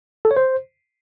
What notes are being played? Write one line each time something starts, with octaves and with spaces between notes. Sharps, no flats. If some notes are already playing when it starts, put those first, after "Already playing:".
A4
C#5
C5